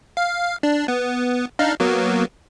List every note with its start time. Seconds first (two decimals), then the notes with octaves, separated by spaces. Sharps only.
0.17 F5
0.63 D4
0.88 B3
1.59 D4 D#4 F5
1.80 F#3 A#3 B3